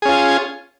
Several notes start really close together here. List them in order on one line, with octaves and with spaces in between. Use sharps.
G#4 C#4 F4